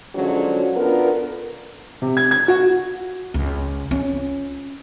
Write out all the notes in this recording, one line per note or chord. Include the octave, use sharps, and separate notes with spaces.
D3 F3 F#3 G#3 C#4
B3 D4 F4 A4 A#4
C3
G#6
G#6
F#4
C#2
C#4 F4